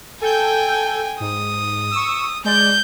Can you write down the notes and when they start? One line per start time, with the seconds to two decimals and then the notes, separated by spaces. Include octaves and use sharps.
0.21 A4 G5 G#5 G6
1.20 G#2 D#6
1.91 C#6 E6
2.45 G#3 D5 G6